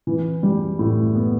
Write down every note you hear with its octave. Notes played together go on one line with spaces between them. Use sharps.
E3
G3
A2
B3